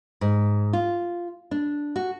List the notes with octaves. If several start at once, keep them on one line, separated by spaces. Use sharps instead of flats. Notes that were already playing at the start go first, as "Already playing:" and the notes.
G#2
F4
D4
F#4